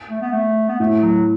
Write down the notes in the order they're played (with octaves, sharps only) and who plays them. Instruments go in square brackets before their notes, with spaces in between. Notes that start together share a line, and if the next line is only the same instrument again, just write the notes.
[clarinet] A3
B3
A3
B3
[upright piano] A2 [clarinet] A3
[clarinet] F#3